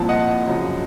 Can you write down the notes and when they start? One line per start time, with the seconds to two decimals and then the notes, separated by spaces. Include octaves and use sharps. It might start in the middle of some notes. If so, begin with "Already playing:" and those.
Already playing: C2 A#2 F3 C4 A5
0.09 D#5 F#5
0.47 F#2 C#3 F3